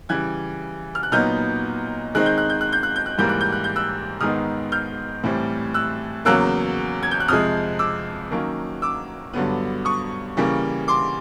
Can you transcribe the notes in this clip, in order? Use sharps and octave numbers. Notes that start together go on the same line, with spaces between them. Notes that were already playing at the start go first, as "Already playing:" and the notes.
C#3 E3 G3 F#6 G#6
F6
F#6
A#2 F#3 B3 D#4 F6 G6
D#3 G#3 C4 D#4 F#6
G6
F#6
G6
F#6
G6
F#6
G6
F#6
G#2 E3 G3 A#3 G6
F#6
G6
F#6
G6
E6 F#6
G#2 D#3 G#3 B3 D#4 D#6 F6
F6 G6
A2 E3 G3 C4
E6 F#6
E2 C#3 F#3 A#3 E6 F#6
G#6
G6
F#6
F2 C3 F3 G#3 D#6 F6
D6 E6
D#3 F#3 A#3 C#4
D6 E6
G2 D3 F#3 B3
C#6 D#6
C#3 E3 G3 A#3
C6 D6